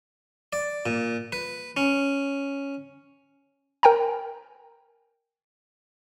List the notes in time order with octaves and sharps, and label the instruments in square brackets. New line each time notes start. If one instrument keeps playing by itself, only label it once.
[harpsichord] D5
A#2
B4
C#4
[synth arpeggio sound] A#4 G5 G#5 A#5